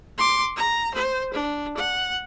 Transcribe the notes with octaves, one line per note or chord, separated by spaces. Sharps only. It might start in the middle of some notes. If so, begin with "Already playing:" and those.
C6 D6
A#5
C5
D4
F#5